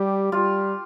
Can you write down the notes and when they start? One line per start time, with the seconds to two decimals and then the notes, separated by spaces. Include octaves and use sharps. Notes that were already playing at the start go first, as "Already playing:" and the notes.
Already playing: G3 G4
0.32 G3 F4